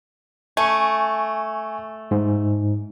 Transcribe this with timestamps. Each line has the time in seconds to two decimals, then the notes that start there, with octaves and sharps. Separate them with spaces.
0.57 A3 G#5 C#6
2.11 G#2